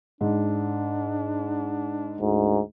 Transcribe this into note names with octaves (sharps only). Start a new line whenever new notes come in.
G#2 D4
D2 G#2